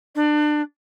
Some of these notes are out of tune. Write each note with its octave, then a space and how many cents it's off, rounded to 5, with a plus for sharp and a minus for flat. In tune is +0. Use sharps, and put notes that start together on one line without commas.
D4 +30